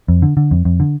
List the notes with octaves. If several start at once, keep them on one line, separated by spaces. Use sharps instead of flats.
F2
D3
D3
F2
F2
D3